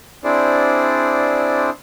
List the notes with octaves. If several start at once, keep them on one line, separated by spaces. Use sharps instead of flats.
C4 D4 E4 G#4 C5 D5